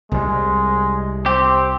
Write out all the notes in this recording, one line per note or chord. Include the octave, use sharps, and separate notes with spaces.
C2 G3 G#3
C4 G4